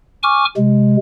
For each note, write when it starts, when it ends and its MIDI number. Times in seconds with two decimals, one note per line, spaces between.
0.23 0.45 80
0.23 0.45 85
0.23 0.45 86
0.23 0.45 89
0.57 0.97 48
0.57 0.97 56